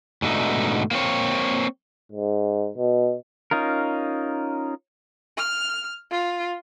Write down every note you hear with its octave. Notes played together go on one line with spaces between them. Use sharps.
G#2 B2 D3 A3 D#4
A#3 C4 C#5
G#2
B2
C#4 D#4 F4 A#4
F6
F4